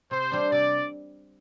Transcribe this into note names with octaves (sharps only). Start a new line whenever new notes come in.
C3 C5
G3 D4
C3 D5